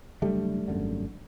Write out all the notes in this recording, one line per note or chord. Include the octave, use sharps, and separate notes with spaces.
F#1 F#2 D3 G3 A3
G#1 F#2 D3